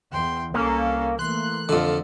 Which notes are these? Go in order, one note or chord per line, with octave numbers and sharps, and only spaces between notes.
E2 G5 C6
C2 A#3 C#4 A4
E3 A3 A#3 C6 F#6
F2 D3 F4 A4